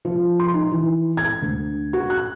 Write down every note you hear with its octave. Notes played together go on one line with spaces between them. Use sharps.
F3
C6
D#4
E3
G#6
D2
F#4
F#6